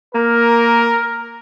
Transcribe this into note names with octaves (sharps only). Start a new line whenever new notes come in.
A#3 A#4